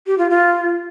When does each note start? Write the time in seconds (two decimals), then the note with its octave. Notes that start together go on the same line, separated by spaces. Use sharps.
0.07 G4
0.18 F4
0.30 F4